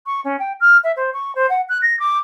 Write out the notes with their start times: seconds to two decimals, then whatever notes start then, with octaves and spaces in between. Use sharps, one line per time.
0.06 C#6
0.24 C#4
0.39 G5
0.60 F6
0.84 E5
0.96 C5
1.14 C#6
1.35 C5
1.50 F#5
1.69 F#6
1.82 A#6
1.99 D6